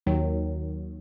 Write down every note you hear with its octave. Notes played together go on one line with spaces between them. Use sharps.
D#2 D#3 F#3